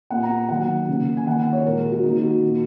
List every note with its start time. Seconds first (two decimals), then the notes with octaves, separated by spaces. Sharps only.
0.10 A#2 A#3 F#5
0.23 A#5
0.49 D#3 F#3 A#3 F#5
0.88 C#3 A#3
1.17 G#5
1.26 D#3 A#3 F#5
1.53 C#5
1.65 A#2 G#3 A#4
1.79 G#4
1.92 F#4
2.03 D#3 A#3 D#4
2.23 F#4
2.43 A#2 A#3